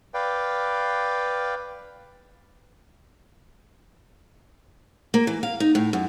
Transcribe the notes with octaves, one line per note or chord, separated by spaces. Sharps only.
B4 D5 F5 G5
A#3
E3
F5
D#4
A2
F#2